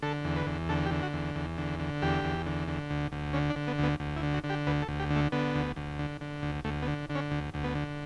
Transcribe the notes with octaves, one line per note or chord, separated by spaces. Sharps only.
D3 A4
E2
B4
E2
D3 A4
G4
D3
F#4
E2
E2
D3
D3
E2 G4
E2
D3
D3
D2
D2
D3 C#4
D4
D3
B3
D2 B3
D2
E4
D3
F#4
D3
G4
D2 B4
A4
D2
G4
D3
A3
D3 B3
D2
D2
D3
D3
D2
D2 A3
B3
D3
D3
C#4
D2
D2
B3
D3